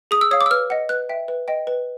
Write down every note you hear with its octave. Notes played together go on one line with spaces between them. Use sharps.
G#4 D#6
E6
C#5 F5 D#6
D6
E6
B4 F6
D#5 F#5
B4 F#6
E5 G5
B4
D#5 G5
B4